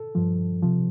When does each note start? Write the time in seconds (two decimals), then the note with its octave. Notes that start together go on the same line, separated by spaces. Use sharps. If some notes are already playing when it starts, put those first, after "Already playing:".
Already playing: A4
0.15 G2 F3
0.63 C3 F3